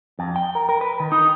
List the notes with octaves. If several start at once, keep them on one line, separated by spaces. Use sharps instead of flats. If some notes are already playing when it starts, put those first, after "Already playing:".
F2
G5
A#4
A#4
B4
D#3
D#4